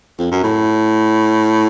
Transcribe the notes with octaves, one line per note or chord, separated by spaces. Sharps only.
F2
F#2
A2